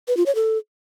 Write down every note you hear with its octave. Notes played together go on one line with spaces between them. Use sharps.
B4
F4
C#5
A4